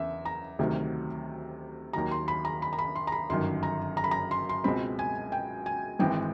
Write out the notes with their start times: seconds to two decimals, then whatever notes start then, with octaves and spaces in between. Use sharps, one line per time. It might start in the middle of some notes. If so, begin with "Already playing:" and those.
Already playing: E2 C#3 E5
0.25 A#5
0.59 D2 C3 D#3 F#3
1.93 D#2 D#3 F#3 A#5
2.11 C6
2.28 B5
2.45 A#5
2.62 B5
2.73 A#5
2.79 B5
2.96 C6
3.07 A#5
3.12 B5
3.29 G1 F#2 D#3 C6
3.63 A#5
3.97 A#5
4.04 B5
4.11 A#5
4.31 C6
4.49 C6
4.64 C#2 B2 G#3 C4 B5
4.99 G#5
5.32 G5
5.66 G#5
5.99 G#1 G#2 E3 G#3 C4 G5